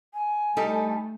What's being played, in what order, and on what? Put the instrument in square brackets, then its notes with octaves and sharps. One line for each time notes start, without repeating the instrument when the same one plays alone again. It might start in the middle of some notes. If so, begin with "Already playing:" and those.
[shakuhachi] G#5
[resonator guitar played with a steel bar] G3 D#4 A4 [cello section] A3